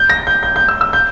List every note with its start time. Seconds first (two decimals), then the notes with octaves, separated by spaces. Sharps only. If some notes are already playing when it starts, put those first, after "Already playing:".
Already playing: G6
0.10 A#6
0.27 G6
0.43 G6
0.56 G6
0.69 E6
0.81 E6
0.93 G6